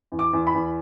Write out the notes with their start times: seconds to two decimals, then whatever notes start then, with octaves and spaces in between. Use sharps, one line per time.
0.12 E2
0.19 D6
0.33 E2
0.47 B5
0.54 E2